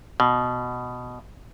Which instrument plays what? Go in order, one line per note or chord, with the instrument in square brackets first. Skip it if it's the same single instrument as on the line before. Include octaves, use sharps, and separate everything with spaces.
[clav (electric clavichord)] B2